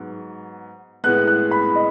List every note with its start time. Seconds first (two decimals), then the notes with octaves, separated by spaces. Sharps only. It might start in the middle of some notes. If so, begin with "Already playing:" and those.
Already playing: G#2 F#3 B3
1.04 A2 G#3 B3 F#6
1.27 F#6
1.51 B5
1.75 D#5